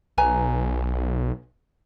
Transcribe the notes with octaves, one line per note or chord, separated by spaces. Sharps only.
B1 B4 G#5 A#5